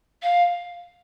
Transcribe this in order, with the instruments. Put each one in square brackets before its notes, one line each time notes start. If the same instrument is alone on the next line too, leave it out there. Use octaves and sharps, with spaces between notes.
[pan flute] F5